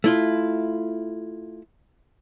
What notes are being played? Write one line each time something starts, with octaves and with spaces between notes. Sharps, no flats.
A3 E4 F4